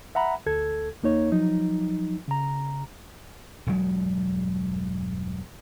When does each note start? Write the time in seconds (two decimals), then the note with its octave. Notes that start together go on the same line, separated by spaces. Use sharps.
0.15 E5 F#5 A#5 B5
0.46 D2 A4 G#6
1.03 D#2 A#3 D#4 C#5
1.32 F3 F#3 D#4
2.28 C#3 A#5
3.67 E1 G2 F#3 G#3